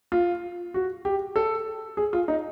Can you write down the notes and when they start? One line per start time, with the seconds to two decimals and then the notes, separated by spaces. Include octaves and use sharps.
0.12 F4
0.74 F#4
1.05 G4
1.36 A4
1.97 G#4
2.13 F4
2.28 D#4